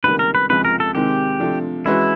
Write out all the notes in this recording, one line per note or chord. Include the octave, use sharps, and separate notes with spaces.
C#2 C3 D#3 G3 A#3 B4
A#4
B4
C#2 C3 F3 G#3 B4
A#4
A4
C3 D#3 G#3 C4 G4
C3 F3 A3 D4
E3 G#3 C#4 E4 F#4 B4